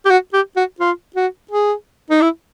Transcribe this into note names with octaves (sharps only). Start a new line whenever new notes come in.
G4
F#4
G4
F#4
F4
F#4
G#4
D#4
E4